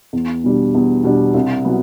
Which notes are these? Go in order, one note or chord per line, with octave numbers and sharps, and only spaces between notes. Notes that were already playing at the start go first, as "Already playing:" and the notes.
E2
B2 G3 D4
E2
B2 G3 D4
C2
B2 F#3 B3